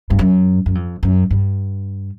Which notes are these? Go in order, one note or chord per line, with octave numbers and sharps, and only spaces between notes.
G2
F#2
F#2
F2
F#2
G2